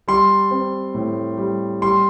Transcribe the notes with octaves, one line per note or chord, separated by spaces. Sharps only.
G3 C6
C4
A2
G3
G3 C6